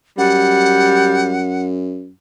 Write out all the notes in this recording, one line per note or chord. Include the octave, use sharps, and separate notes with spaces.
F#2 G3 F#5